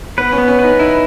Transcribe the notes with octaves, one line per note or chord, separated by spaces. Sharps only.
B3 B4
C#4
B3
C#4
D#4 B4
D#4 E4